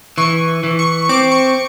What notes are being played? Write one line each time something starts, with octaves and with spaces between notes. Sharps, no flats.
E3 C#6
E3
C#6
C#6
C4 D6
C#6